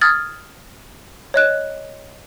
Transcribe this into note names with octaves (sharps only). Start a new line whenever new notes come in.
D#6 F6 G#6 A6
C#5 D#5 F#6